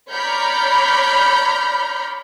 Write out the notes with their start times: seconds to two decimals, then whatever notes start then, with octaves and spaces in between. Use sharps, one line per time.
0.10 C#5 D5 A#5 B5 F6 G6